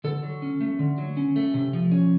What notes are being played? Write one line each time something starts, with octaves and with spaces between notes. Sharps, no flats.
D3 A4
F#3
C#4
A3
D3
F#3
C#4
A3
C3
F3
C#4